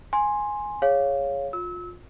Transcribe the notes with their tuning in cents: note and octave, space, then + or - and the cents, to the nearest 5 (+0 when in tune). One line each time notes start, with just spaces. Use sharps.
G#5 +0 C6 +10
G#4 -5 C#5 +0 F5 +0
F4 +25 E6 -30